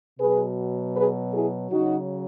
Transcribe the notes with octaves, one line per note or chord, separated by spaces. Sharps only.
B2 F#3 G#4 B4
G#4 B4
E4 G#4
C#3 F#3 D#4 F#4